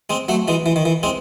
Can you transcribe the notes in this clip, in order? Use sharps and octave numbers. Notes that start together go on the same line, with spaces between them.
G#3 C4
F#3 A3
E3 G#3
E3
D#3
E3
G#3 C4